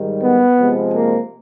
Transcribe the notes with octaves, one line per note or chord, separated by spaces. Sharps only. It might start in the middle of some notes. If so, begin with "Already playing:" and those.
Already playing: G#2 D#3 G3
B3
C3 F3 G#3
A#3